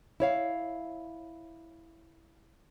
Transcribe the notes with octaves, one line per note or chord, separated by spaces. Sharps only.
E4 C#5 F5